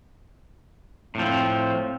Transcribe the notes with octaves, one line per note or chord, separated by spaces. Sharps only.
A2 F3 C4